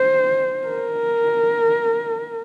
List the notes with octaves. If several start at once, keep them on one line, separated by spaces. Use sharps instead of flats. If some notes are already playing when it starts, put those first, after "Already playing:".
Already playing: C5
A#4